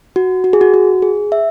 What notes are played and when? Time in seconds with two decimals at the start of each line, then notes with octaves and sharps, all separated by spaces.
0.16 F#4
0.44 F#4
0.53 G#4
0.61 F#4
0.74 F#4
1.02 G#4
1.32 E5